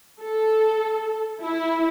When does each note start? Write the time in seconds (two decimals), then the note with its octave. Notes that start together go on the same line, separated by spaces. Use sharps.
0.21 A4
1.43 E4